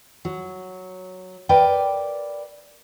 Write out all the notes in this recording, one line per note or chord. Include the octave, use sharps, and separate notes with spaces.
F#3
A#4 B4 D5 G5